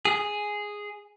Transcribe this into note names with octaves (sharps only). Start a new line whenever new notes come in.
G#4